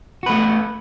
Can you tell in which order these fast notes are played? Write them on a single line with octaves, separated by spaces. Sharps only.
F#4 B4 A3